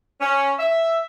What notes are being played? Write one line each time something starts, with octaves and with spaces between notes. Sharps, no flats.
C#4
E5